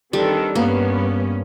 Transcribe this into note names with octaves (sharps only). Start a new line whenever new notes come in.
D#3 G3 C4 D4 A4 B4
G2 A#3 B3 C#4